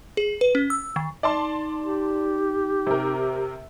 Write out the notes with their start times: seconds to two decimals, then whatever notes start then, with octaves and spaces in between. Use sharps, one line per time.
0.17 G#4
0.41 B4
0.55 C#4
0.70 E6
0.96 D#3
1.23 D#4 D5 A5 C6
1.82 G4
2.87 C3 A#4